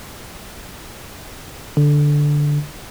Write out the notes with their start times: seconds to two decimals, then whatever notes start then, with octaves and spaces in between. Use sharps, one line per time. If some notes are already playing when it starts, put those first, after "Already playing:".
1.77 D3